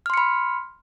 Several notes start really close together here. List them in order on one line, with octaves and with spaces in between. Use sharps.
F6 C6 C#7 B5